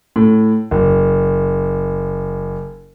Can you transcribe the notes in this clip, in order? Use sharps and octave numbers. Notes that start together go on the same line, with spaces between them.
A2
F#1